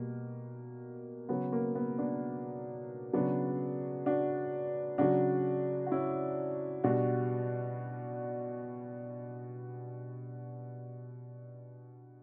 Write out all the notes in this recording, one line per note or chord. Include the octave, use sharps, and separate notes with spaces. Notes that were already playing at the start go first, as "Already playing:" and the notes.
Already playing: B2 G3 A#3
C#3 F#3 B3
A#3
B3
B3 D4
C#3 F#3 B3 D4
D4 F#4
C#3 F#3 D4 F#4
F#4
C#4 E4
B2 G3 D4 F#4